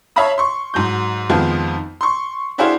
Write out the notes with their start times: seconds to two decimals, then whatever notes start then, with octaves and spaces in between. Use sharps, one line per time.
0.16 C#5 E5 F5 A5 B5 D#6
0.38 C6 C#6
0.74 G#2 F#3 G6
1.29 F2 D#3 F3 G#3 B3 F4
2.01 C6 C#6
2.58 D4 E4 F#4 G#4 C5 F5